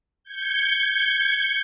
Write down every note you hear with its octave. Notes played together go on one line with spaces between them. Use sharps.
G6 G#6 C#7